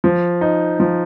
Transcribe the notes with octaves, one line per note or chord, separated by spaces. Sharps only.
F3
D#4
F3